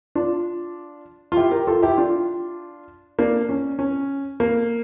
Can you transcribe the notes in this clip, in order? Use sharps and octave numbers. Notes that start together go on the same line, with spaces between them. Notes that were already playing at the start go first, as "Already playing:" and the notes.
D4 F4
F4
E4 G4
G4 A#4
F4 A4
E4 G4
D4 F4
A#3 D4
C#4
C#4
A#3